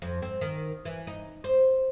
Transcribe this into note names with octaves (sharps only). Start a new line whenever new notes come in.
F2
C4
D#3
E3
D#4
C5